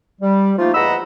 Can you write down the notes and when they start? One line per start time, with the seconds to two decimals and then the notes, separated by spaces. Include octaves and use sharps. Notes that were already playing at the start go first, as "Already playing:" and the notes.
0.21 G3
0.58 F3 A3 A#3 D#4 F4
0.74 E2 D#5 F#5 A#5 B5 E6